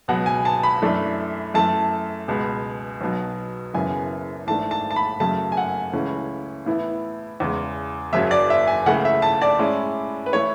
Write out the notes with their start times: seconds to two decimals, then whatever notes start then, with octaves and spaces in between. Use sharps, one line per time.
0.08 C#2 B2 F#3 F#5
0.26 G#5
0.45 A5
0.63 B5
0.82 F#2 E3 A3 D4
1.54 F#2 E3 A3 A5
2.28 C#2 B2 G#3
3.01 B1 B2 F#3
3.74 F#1 F#2 C#3 E3 B3 G#5
4.47 A1 G#2 E3 A3 D4 A5
4.71 A5
4.91 A5
4.96 B5
5.20 F#1 F#2 C#3 F#3 A3 A5
5.52 G#5
5.57 F#5
5.93 C#2 C#3 E3 A3 C#4
6.66 A2 E3 B3 E4
7.40 E2 C#3 G#3
8.13 F#1 F#2 C#3 F#3 E5
8.31 D5
8.50 E5
8.67 G#5
8.86 C#2 C#3 E3 A3 E4 F#5
9.05 E5
9.22 A5
9.42 D5
9.59 A2 G#3 C#4 E4
10.26 B4
10.33 E3 A3 E4 C#5